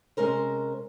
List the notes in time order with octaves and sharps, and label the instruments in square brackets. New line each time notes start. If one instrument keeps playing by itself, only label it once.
[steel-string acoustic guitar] C3 G#3 C#4 A#4 C5